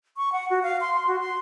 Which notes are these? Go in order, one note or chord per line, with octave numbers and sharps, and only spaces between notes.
C#6
F#5
F#4
F5
C6
C6
F#4
C6